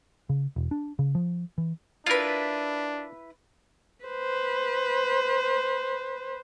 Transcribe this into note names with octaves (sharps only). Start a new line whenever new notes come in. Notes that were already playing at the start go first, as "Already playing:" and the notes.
C#3
E1
D4
C#3
F3
E3
D4 E4 F4 A#4 B4
B4 C5